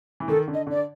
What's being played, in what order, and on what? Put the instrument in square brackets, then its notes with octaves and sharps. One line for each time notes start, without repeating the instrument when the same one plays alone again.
[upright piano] E3
[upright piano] D#3 [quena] A4
[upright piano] D3
[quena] D#5
[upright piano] D3 [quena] D5